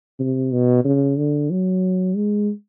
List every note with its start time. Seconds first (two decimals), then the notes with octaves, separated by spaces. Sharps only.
0.20 C3
0.52 B2
0.85 C#3
1.17 D3
1.50 F#3
2.16 G#3